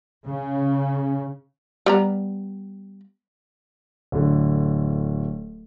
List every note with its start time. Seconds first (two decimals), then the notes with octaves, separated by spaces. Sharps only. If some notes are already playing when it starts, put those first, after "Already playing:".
0.25 C#3
1.86 G3 B3 A#5
4.12 D1 D3